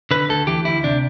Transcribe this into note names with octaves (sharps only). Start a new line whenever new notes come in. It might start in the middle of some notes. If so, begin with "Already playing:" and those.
D3 B4
D2 A4
E3 G4
D2 E4
C3 D4